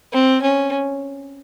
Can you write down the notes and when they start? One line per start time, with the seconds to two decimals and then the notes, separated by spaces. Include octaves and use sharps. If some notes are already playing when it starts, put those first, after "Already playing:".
0.13 C4
0.42 C#4